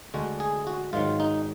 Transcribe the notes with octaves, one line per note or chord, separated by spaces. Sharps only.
D2 D3 G#3 F#4
G#4
F#4
G#2 D#3 F#3 F4
D#4